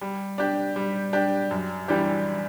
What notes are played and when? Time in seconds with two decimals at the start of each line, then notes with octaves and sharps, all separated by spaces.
0.01 G3
0.38 D4 G4
0.76 G3
1.13 D4 G4
1.51 F#2
1.88 E3 G3 D4 G4